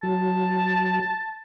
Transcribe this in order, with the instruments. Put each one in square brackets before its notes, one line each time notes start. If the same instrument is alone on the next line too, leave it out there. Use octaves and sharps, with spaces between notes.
[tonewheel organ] F#3 [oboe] A5